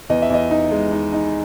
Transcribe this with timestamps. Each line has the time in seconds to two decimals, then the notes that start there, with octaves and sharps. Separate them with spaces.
0.10 E2 D#5
0.22 E5
0.30 E2 D#5
0.51 D#4
0.71 G#3
0.92 D#4
1.13 D#4